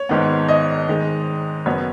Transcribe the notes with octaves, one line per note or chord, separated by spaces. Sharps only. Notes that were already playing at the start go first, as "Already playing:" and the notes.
Already playing: C#5
G#1 G#2 D#3 B3
D#5
G#2 D#3 G#3
F#1 F#2 F#3 B3 C#5